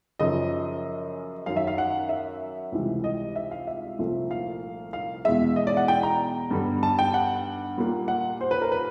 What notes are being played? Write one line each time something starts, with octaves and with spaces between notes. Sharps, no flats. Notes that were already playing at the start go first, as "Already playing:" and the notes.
F#2 C#3 F3 D#5
F#2 D#3 F#3 F5
E5
F5
F#5
E5
C#2 C3 E3 G3
D#5
E5
F5
E5
C2 A#2 F3 A3 C4
F5
F5
E2 B2 G#3 E5
D#5
D5
F#5
G5
A#5
G2 D3 G3 B3
A5
G5
F#5
A#2 G3 A#3
F#5
C5
B4
A#4
B4